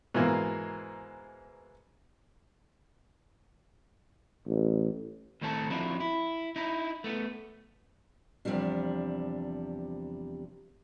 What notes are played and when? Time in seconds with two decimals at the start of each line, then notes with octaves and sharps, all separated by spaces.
0.14 G#2 B2 E3 A#3
4.47 A1
5.41 A2 D#3 A3 C4 G#5 A5
5.70 F3 C4 D4 E4 F#4
6.00 E4
6.56 D#4 E4
7.04 A3 B3
8.45 E2 C3 E3 F3 G3 D4